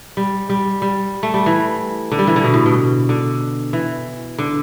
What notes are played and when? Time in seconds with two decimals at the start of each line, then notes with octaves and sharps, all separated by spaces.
0.17 G3
0.49 G3
0.82 G3
1.23 A3
1.34 G3
1.46 E3
2.12 D3
2.19 G3
2.27 E3
2.36 D3
2.44 B2
2.54 A2
2.66 B2
3.09 D3
3.73 E3
4.38 D3